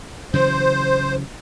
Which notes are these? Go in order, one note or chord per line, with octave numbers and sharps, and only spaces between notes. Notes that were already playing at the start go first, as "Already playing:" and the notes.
C#3 E3 F#3 C5